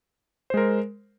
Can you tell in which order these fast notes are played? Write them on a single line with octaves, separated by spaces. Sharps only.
C5 G#3 A#4